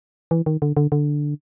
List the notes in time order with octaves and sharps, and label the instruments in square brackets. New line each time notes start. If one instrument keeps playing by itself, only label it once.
[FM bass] E3
D#3
D3
D3
D3